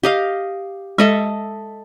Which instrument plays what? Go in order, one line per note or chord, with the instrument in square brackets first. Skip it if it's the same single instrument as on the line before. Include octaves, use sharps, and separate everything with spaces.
[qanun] G4 D#5 F5
[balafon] G#3 [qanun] A4 D#5 E5